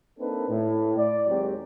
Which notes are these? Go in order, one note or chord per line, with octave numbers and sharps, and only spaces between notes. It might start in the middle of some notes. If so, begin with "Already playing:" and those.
A#3 C4 D4 D#4 A4 B4
A2
D5
D#2 F#3 G#3 C4 G4